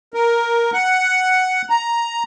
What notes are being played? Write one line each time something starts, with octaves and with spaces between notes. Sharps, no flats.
A#4
F#5
A#5